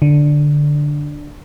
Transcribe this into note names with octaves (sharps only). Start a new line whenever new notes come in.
D3